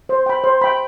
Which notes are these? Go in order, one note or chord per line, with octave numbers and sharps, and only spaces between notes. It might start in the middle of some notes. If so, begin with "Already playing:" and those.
C5
G5 B5
C5
G5 B5